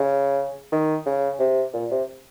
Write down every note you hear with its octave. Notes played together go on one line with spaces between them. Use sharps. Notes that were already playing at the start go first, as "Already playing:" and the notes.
Already playing: C#3
D#3
C#3
C3
A#2
C3